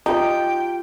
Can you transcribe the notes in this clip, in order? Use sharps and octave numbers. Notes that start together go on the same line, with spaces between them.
D#4 F4 G4 G5